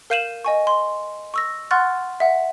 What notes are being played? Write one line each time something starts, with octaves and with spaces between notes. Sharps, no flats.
A#4 F5 G6 D#7 E7 F#7
D#5 G#5 C#6
C6
C#6 E6 A#6
F#5 C6 C#6 F6 F#6 A6
E5 F#5